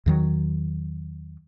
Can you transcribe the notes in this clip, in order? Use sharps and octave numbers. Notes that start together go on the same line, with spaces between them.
E2 D#3 F#3